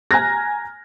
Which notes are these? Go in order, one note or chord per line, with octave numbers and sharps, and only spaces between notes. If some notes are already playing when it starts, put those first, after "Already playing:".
G#5 A#5 F6 F#6 G#6 A#6